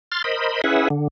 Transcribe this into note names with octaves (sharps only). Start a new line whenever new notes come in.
C6 F6 A6
A#4 C5 D#5 B5
C#4 E4 G#4 B4 E5 F#5
D3